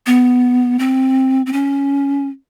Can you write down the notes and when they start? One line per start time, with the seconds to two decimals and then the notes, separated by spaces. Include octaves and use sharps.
0.07 B3
0.79 C4
1.46 C4
1.53 C#4